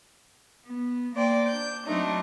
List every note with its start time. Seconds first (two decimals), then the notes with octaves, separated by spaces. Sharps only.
0.67 B3
1.15 A#3 C5 D5 G5
1.47 D4 G6
1.86 F#3 A3 C4 D4 D#4